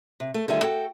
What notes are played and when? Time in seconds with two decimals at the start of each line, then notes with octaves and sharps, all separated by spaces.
0.20 C3
0.34 A3
0.48 D3 D#3 G3 F4 E5 G#5
0.61 F#4 A4 G5